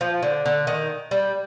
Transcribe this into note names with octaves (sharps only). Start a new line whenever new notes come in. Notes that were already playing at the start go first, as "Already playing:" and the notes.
F3
D3
D3
D#3
G3